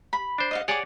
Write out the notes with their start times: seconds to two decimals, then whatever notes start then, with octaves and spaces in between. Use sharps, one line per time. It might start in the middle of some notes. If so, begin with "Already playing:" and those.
0.13 B5
0.38 D4 C5
0.51 D#5 F5 F#5
0.68 G#4 C#5 D5 F#5 G5 D6